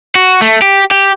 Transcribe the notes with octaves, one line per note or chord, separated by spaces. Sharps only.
F#4
A3
G4
G4